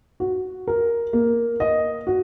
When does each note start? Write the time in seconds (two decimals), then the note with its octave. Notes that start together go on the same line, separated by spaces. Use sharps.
0.20 F#4
0.67 A#4
1.13 A#3
1.60 D#5
2.07 F#4